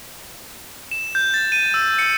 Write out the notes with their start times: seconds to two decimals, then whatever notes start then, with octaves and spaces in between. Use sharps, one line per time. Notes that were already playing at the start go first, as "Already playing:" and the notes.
0.91 E7
1.15 G6
1.34 A6
1.52 D#7
1.74 E6
1.99 C#7